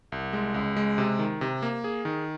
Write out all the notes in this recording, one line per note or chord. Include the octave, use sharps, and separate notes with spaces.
C2
G#3
C#2
G#3
C3
D#3
C3
A#3
G#4
D#3